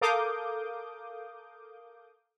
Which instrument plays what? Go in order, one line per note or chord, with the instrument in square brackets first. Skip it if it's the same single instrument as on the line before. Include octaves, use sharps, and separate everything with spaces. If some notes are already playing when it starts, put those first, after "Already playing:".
[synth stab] A4 A#4 F5 D6 D#6 G6